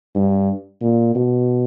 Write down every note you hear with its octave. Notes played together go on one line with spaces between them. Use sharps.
G2
A#2
B2